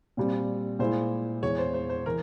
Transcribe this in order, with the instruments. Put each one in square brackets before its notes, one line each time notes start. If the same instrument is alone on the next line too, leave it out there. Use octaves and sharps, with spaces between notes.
[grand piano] A#2 G3 C4
[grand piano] A#2 G#3 E4 [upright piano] C5
[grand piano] E2 E3 G#3 [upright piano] C#5
[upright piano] C5
C5
C5
[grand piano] E3 [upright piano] A#4